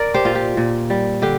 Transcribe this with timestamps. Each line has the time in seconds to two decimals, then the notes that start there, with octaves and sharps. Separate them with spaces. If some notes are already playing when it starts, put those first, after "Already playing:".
Already playing: A#4 D5
0.14 G4 C5
0.25 A#2 F4
0.35 G4
0.57 A#2
0.90 G3
1.22 D3 G4